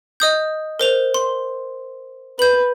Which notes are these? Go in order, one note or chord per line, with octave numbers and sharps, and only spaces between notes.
D#5 D#6 G6
A#4 C5 F7
C6
B4 G6 F#7